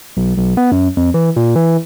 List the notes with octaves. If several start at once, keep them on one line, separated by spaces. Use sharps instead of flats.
B1
B1
B3
F#2
F2
E3
A#2
E3